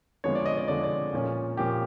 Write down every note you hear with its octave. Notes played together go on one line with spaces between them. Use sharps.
F2 D3 F3 G#3 B3 C#5
D5
D#5
D5
F2 D3 F3 G#3 B3 D5
D5
A#2 F3 A#3 C#4
A#2 F3 A#3 C#4 G4